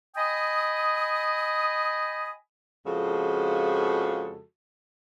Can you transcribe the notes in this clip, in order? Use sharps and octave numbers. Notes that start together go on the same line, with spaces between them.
D#5 G5 G#5 B5 D#6
F2 C#3 F3 G#3 F#4 A4